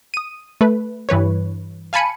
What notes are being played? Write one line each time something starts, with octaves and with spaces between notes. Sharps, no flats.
D#6 D#7
A3 B4
G2 E3 B4 C#5
F5 G#5 A5 B5 C#7 D#7